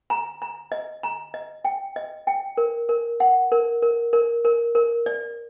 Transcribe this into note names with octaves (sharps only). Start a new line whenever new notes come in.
A#5
A#5
D#5
A#5
D#5
G5
D#5
G5
A#4
A#4
F#5
A#4
A#4
A#4
A#4
A#4
D5